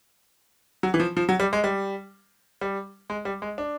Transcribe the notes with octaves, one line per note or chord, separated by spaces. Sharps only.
F#3
E3
F3
F3
F#3
G3
G#3
G3
G3
G#3
G3
G#3
D4